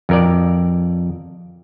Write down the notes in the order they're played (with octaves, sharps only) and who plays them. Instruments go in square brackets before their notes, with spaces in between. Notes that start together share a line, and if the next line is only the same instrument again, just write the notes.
[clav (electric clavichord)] F2 A#4 D5